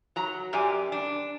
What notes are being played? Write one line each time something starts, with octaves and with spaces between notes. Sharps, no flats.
F#3 A#5
F#2 G4 D5 G#5
D4